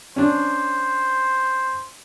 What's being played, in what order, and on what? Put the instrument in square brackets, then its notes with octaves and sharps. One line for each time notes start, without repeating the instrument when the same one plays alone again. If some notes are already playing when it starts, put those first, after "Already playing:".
[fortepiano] C#4 D4 [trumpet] C5